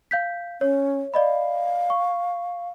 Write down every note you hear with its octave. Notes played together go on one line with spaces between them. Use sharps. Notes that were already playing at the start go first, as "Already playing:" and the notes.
F5 G6 B6
C#4 C#5
D5 D#5 F5 B5
C#6